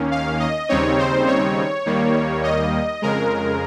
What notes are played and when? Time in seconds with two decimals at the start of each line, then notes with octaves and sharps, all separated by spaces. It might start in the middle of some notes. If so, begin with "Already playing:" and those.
Already playing: D#2 D#3 A#3 C#4
0.11 F5
0.40 D#5
0.69 D#2 C#3 G3 C4 D#4 C#5
0.99 C5
1.27 C#5
1.86 D#2 D#3 G3 A#3
2.44 D#5
3.02 F2 C#3 G#3 A#4